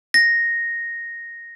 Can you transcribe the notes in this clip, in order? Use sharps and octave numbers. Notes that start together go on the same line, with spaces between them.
A#6